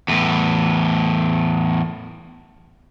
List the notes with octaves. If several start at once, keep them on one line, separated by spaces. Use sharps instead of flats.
E2 A2